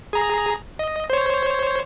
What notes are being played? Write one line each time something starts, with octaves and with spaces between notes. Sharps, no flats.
G#4 A#5
D#5
C5 C#5